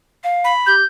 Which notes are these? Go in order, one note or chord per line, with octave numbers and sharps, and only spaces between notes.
F5
B5
G4 G6